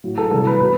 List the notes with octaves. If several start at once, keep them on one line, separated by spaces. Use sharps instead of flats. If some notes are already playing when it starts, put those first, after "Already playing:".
A2 F#3
A4
C3 E3 G3 A4
B4
B2 B4